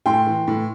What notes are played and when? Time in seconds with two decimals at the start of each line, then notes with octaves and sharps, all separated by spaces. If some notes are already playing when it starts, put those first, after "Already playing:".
0.06 A2 G5 C6
0.27 E3
0.47 A2